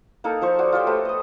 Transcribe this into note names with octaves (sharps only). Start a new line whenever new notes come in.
A#3 D#4 A4
F3 C5 C#6
F#4 D5 D#6
F4 G4 C#5 G5
A3 F#4 B4 C5
D#5 D#6